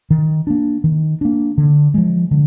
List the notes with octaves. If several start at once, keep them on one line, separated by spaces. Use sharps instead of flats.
D#3
A#3 D4
D#3
A#3 D4
D3
F3 G#3
D3